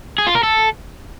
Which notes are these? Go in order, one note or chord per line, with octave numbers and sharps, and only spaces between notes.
G#4
F4
A#4
A4